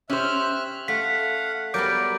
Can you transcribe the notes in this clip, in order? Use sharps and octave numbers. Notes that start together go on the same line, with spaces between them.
C#4 G4 C5 E5 F6 F#6
A3 F5 F#5 B6
F#3 G3 B3 A#4 D5 D6 G6 D7